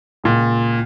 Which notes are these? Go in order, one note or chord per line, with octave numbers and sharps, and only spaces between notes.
C#2 A#2